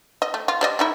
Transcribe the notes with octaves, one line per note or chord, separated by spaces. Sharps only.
D#5
A3
F4
G3 D5 D#5
A3 D#4 E4